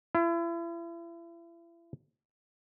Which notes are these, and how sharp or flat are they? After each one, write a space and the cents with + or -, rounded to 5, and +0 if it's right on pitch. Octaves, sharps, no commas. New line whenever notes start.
E4 +40